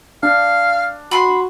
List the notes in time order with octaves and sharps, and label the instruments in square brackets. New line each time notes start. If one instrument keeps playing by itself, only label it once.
[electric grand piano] D4 [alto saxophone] F5
[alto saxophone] F#4 [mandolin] B5 C6